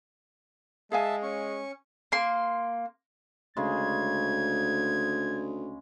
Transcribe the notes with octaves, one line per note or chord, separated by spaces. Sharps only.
G#3 G#4 E5 F5 G#5 A5
C#4 C#6
A#3 C6
D2 C#3 G#3 G#6